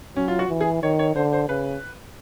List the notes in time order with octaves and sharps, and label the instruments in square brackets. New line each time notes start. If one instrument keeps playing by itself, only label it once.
[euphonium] F#3 [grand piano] C#4
[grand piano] F4
F#4
[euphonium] E3
[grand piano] G#4
[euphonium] D#3 [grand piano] C#5
[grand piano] C#5
[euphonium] D3 [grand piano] C5
[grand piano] C5
[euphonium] C#3 [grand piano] B4